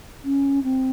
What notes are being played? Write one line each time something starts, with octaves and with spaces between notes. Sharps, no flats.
C#4
C4